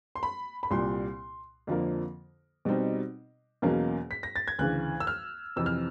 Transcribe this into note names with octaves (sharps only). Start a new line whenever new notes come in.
C6
B5
B5
C2 A#2 G3 C6
F2 D3 F3 A#3
B2 G3 C4 D#4
E2 B2 F#3 A#3 C#4
B6
A#6
A6
G#6
D2 C#3 E3 F#6
E6
F6
F2 C3 E3 E6
F6